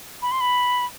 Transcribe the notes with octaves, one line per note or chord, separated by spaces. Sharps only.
B5
C6
B5